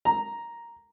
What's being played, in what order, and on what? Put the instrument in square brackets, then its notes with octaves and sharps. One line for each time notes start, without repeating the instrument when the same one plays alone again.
[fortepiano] A#5